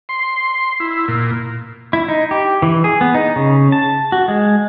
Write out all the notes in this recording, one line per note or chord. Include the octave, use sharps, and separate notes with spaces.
C6
E4
A#2
E4
D#4
G4
E3
G#4
B3
D#4
C#3
A5
F#4
G#3